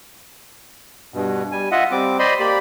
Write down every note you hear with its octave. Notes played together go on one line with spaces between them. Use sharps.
G2 B2
G3 G#5
F4 D#5 E5 F#5
G3 C4 D6
C5 D5 D#5 B5 C6
A#3 G4 D5 B5